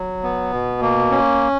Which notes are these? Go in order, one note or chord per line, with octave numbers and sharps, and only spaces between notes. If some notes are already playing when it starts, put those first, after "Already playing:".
Already playing: F#3
B3
B2
A#3
C#4